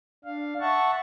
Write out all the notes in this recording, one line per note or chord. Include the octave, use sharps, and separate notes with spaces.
D4 F5
E5 F#5 A5 C#6